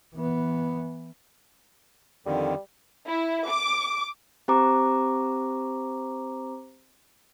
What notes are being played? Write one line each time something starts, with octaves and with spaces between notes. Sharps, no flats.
E3 B3
F2 D3 D#3 G3
E4
D6
C4 G4 C5 A#5 D6